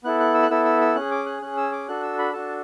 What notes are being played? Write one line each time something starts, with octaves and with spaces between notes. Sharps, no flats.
B3 E4 A4 F#6
F#6
E6
F#6
B3 E4 A4 E6
E6
E6
C#4 G#4 F#6
D6
F#6
C#4 G#4 F#6
E6
D6
D4 F#4 A4 F#6
E6
B5
D4 F#4 A4 A5